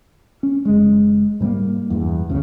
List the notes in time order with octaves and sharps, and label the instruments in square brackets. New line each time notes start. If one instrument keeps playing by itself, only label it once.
[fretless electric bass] C#4
F#1 G#3
G#2 G3 G#3 A#3
E2 G2
G1 D2 C#3